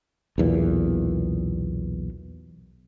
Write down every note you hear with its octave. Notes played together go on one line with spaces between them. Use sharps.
B1 E2 A#2